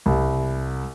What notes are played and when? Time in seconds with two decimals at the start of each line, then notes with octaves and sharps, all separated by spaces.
0.06 C2